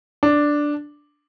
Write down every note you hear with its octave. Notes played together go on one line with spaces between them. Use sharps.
D4